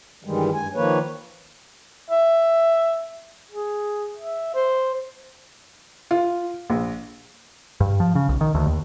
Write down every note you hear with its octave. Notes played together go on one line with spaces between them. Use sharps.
G2 D#3 E3 G3 G#3
G2 G#5
D#3 F3 A#3 B4 C#5
E5
G#4
E5
C5
F4
A#1
G2
F3
C#3
B1
D#3
D2
D#2